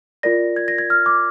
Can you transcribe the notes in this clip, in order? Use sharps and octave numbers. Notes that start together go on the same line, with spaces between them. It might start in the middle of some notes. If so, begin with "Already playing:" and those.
F4 A#4 D5 A#6
G#6
A#6
G#6
F6
D6